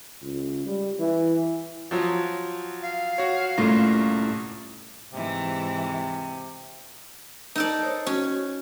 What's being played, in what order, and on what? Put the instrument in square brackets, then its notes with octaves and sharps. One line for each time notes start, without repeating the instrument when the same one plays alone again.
[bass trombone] C#2
G3
E3
[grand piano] F3 F#3
[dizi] F5
[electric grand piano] F#4 C#5
[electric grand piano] C2 A#3 A#6 [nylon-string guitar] A2 C#4 F4
[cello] G#2 E3 [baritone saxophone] C3
[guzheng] D#4 A4 D5 [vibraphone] A#4
[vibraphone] C5 C#5 D#6
[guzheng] C#4 [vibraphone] F#4